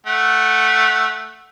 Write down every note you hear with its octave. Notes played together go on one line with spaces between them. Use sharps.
A3 F#5